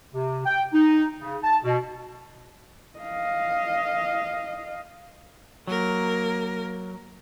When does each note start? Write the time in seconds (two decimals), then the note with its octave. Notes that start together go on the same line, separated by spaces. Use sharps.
0.14 C3
0.45 G5
0.73 D#4
1.20 C#3
1.43 A5
1.64 B2
2.99 D#5 F5
5.67 F#3 A#3 A#4